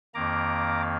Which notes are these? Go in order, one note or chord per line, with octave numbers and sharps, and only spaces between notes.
F2 D#3 A#3 A#5 D6